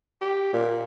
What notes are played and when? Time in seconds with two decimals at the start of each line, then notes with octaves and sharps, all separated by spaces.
0.21 G4
0.53 A#2